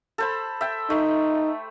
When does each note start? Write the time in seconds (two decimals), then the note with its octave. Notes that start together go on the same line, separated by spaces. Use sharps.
0.18 A4 C5 B5
0.61 E5 G5
0.90 A3 D#4